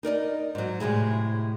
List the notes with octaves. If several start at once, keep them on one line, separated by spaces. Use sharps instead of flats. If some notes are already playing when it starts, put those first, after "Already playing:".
D#4 A#4 D5 D#5
G#2 F#3
A2 C3 G#3 E4